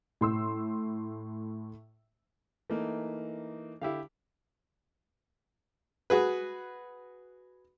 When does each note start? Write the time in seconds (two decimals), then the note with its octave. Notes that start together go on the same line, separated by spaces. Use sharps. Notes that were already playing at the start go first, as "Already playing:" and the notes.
0.21 A2 C6 E6
2.70 E3 A3 A#3 D#4
3.81 D3 E4 G4 F5
6.10 F#4 G#4 B4